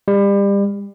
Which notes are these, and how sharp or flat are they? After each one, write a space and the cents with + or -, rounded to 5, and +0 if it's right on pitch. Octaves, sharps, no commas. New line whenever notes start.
G3 +30